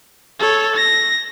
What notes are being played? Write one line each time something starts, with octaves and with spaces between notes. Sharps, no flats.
A4 C#5
A#6